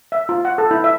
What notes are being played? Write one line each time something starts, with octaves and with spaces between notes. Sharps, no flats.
E5
F4
F#5
A4
E4
E5